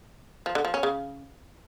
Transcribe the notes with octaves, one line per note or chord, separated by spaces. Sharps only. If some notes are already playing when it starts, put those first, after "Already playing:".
F3
D3
F3
C#4
C#3